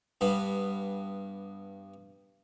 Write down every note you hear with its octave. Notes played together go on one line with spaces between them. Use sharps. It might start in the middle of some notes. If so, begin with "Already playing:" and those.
G2 B3